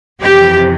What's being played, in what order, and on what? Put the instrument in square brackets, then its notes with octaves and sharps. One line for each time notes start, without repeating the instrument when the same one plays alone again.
[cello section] F2 C3 E3 G4